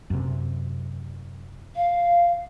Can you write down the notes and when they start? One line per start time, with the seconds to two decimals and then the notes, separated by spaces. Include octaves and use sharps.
0.10 F#2 C3
1.76 F5